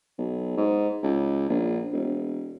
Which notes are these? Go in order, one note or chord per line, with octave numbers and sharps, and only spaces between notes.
B1
G#2
C#2
A#1
E1